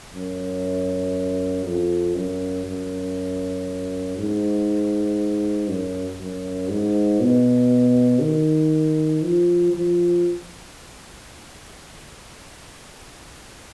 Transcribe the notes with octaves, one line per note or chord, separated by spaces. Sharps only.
F#2
F2
F#2
F#2
G#2
F#2
F#2
G#2
B2
D#3
F3
F3